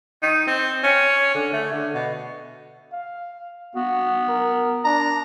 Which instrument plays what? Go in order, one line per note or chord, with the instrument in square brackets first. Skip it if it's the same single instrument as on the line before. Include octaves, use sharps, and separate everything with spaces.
[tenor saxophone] D#4
C4
C#4
D3
A3
D3
B2
[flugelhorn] F5
[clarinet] B3 [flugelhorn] F#4
[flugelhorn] A#4
[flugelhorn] D4 [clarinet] A#5